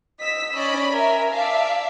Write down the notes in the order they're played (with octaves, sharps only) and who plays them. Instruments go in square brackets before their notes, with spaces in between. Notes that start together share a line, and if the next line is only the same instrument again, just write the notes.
[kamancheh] D#5 E6 [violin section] B6
[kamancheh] C#4 [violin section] D5 D#5 B5
[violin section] A#4 E5 [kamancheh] G#5
[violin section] D5 E5 F5 [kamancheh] A5